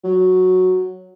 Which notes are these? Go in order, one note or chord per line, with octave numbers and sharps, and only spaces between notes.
F#3